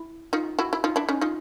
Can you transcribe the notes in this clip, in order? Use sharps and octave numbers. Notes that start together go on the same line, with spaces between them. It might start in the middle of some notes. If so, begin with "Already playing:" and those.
Already playing: E4
D#4 F4
E4 F#4
E4
D#4 F4
D4 E4
C#4 D#4
D#4 F4